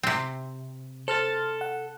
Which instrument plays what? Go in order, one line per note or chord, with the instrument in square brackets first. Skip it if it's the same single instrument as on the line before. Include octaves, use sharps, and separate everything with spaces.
[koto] C3 C4
[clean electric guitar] A4 [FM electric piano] C5 F6 A6
[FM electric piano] F#5